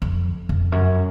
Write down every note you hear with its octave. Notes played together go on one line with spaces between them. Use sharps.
F2
F2
F#2